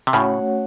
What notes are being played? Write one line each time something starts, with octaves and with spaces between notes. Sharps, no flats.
C3
A2 C#3 A3 C#4 F#4 C#5 F#5